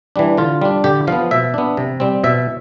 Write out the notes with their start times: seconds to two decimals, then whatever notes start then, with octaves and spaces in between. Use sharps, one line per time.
0.16 E3 G3 D4
0.38 D3 F4
0.61 G3 D4
0.84 D3 G4
1.07 F3 B3 F5
1.31 B2 E5
1.54 B3 D4
1.77 C3
2.00 G3 C4
2.24 B2 E5